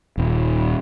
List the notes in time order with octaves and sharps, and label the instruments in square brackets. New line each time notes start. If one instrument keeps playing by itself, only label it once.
[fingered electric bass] D#1